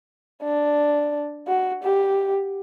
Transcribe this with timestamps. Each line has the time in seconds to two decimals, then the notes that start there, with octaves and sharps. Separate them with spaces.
0.43 D4
1.47 F#4
1.83 G4